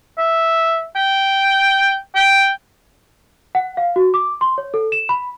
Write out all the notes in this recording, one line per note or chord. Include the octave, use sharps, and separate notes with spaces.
E5
G5
G5
F#5
F5
F#4
D6
C6
C#5
A4
E7
B5